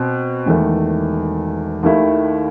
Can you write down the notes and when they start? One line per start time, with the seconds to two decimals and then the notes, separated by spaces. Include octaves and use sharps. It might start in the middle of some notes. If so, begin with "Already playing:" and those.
Already playing: B2 C4
0.46 E1 E2 D#3 A3
1.83 D#2 D#3 A3 E4